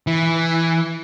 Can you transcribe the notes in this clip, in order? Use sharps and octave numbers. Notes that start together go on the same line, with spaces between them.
E3